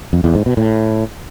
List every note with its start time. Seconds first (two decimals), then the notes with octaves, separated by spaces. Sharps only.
0.13 F2
0.24 E2
0.35 G#2
0.46 B2
0.57 A2